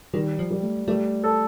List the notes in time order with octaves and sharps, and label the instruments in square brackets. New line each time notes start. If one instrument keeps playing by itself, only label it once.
[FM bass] D#3 [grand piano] G3
[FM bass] F3
[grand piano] G3
[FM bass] A3
[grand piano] G3 [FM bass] A3
[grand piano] A4